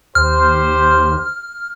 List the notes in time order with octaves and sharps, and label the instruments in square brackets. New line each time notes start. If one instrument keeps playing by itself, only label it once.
[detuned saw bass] D#2 [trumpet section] G4 C5 [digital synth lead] F6